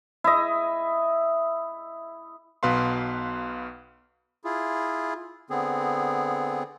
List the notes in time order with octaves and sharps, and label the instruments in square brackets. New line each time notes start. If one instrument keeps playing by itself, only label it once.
[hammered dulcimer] E4 D#5
[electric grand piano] B1 B2 B4 F5 C6
[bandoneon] E4 F4 G#4
D3 B3 C4 G#4